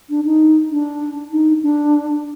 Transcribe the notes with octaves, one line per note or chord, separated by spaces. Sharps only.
D4
D#4
D4
D#4
D4